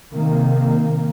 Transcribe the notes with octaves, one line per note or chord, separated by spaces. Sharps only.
C3 D#3 A#3